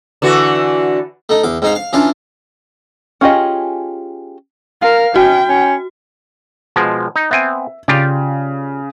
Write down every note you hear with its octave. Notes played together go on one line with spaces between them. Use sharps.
D3 E3 F#4
A3 D#4
E2 D6
G#2 D#4 F5
F5
E3 C#4 D4 F4
C#4 F4 G4 G#4 D#5
A#4 F5
C#4 F#4 G5
C#4
B2 F3 G#3
D#4
B3 C4 E5 G#5
C#3 F4 G4 D5